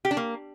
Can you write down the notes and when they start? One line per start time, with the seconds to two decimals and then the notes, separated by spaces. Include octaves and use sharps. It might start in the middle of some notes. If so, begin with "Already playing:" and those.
0.05 G4
0.11 D4
0.17 A#3